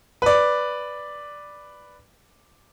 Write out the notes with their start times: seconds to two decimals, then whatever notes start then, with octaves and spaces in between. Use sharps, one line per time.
0.22 B4 D5